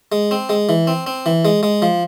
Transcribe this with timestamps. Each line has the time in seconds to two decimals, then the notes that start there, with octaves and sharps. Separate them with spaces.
0.12 G#3
0.31 C4
0.49 G#3
0.69 E3
0.87 C4
1.07 C4
1.26 E3
1.45 G#3
1.63 G#3
1.82 F3